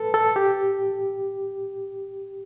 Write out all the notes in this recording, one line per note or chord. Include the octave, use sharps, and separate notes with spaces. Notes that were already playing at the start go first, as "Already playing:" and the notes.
Already playing: A4 B4
A4
G4